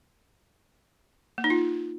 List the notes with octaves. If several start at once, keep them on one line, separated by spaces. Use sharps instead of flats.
A#3
D#4
F4